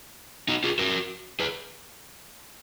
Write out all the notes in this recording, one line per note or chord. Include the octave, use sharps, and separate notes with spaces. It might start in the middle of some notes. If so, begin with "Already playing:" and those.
D#4 F#4
F4 G#4
F#4 A#4
G#4 B4